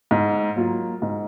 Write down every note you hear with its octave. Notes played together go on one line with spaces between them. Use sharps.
G#2
F#3 A#3 F4
G#2